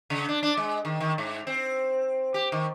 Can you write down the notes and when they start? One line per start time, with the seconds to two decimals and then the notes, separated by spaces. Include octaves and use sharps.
0.10 C#3
0.29 D4
0.43 D4
0.57 G#3
0.85 D#3
1.00 D#3
1.18 G#2
1.47 C4
2.34 G4
2.52 D#3